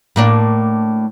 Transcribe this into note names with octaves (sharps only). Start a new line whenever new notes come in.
A2 A#3 D4